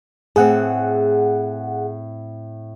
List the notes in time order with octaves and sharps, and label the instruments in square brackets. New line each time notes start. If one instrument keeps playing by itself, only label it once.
[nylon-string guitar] A2 A3 C4 [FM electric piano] G#4 F#5